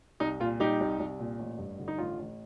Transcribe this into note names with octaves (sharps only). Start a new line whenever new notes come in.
C2 D#4
A#2 F4
G3 D#4 G4
C2
C2
A#2
A1
G2
D3
D#4
A1 F4
A1